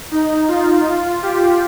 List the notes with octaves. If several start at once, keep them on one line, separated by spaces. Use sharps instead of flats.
D#4
F4
G4